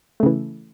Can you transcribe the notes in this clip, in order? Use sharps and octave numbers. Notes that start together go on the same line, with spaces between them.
C#3 E3 A3